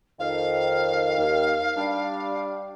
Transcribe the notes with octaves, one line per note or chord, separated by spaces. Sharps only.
F2 D#3 F5
D#2
G3 D4